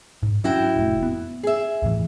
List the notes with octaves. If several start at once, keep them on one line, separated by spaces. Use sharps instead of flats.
G#2
F#3 C#4 D4 E4 F#4 G5
F1 A2
B3
G#4 E5
D#2 A2 E3